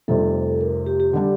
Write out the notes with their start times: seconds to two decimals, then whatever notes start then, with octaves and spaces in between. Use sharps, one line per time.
0.08 F1 F2 C3 G3 A4
0.61 A#4
0.86 G4
1.00 G4
1.13 D3 G3 D4